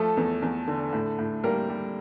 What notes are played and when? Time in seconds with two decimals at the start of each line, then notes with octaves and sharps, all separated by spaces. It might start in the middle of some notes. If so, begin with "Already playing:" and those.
Already playing: F3 A3 A4
0.17 E2
0.42 E2
0.68 D3
0.93 A2
1.19 A2
1.44 G3 A#3 A#4
1.70 G3